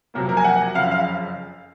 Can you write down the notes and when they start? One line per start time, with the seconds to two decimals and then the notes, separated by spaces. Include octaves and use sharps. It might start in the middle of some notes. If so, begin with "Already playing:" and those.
0.14 F2 C3 F#3 A#3
0.29 A#4
0.37 G#5
0.44 F#5
0.75 F#1 F2 C#3 F5
0.91 F5